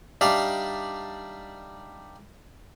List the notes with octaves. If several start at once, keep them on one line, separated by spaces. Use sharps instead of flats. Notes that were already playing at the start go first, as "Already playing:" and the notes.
G3 D4 D#4 D5 E5 F5